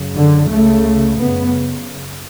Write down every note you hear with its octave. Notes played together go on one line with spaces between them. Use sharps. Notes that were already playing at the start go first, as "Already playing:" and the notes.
Already playing: F#2 C#3
D3
C#2 C#3 A3
F#2 C#3 B3